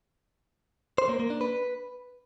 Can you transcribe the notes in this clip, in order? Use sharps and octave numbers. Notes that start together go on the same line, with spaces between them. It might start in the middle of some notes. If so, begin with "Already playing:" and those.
C5
A#3
A#3
D4
B4